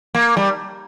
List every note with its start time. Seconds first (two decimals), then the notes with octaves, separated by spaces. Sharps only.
0.15 A#3
0.37 G3